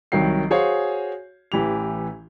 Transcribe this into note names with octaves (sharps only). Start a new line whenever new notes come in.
C2 D#3 F#3 G5 C7
F#4 G#4 C5 C#5 F5 G#5
A1 E3 G4 F7